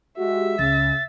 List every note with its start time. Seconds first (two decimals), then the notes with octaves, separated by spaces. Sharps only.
0.18 G#3 F#4 G4 E5
0.59 C#2 C#3 A6